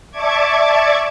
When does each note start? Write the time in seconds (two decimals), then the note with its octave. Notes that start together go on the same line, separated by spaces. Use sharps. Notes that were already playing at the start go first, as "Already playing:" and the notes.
0.11 D5 E5 A5 C#6 D6 G#6